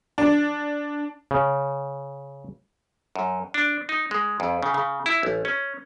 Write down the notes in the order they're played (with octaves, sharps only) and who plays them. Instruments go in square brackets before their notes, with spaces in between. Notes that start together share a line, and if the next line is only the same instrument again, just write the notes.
[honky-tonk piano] D4
[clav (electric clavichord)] C#3
F#2
D4
D#4
G#3
F2
C#3
C#3
E4
A1
C#4